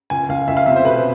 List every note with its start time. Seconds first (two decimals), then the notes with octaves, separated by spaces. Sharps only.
0.10 C#2 G#5
0.29 C#2 F5
0.48 C#2 E5
0.57 F5
0.66 C3 E5
0.76 C5
0.85 B2 B4